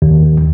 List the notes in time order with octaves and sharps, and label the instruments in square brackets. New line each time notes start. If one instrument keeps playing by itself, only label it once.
[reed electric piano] D#2